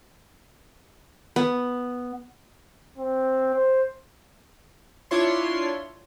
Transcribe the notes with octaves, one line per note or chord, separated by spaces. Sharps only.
B3
C4
C5
D4 E4 F4 C#5 C6